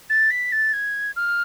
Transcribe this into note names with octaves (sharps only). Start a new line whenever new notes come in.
A6
B6
A6
G#6
F6